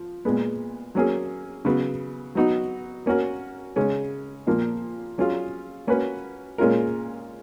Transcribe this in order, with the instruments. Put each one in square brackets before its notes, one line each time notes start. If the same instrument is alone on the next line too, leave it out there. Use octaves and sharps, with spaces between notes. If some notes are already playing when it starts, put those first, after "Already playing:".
Already playing: [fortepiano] F3
A#2 G#3 B3
F#3 A#3 C#4 G#4
C#3 F#3 B3
F#3 B3 D#4 F#4
A#3 C#4 F#4 A#4
C#3 G#3 C#4
A#2 F3 A#3
F#3 C#4 F4 G#4
A#3 C#4 F#4 B4
A#2 G#3 C#4 F4 A#4